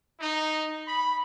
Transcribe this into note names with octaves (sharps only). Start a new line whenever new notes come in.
D#4
B5